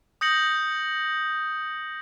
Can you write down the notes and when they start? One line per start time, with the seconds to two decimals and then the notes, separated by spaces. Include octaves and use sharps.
0.21 D#6 G6 A#6 C#7 F#7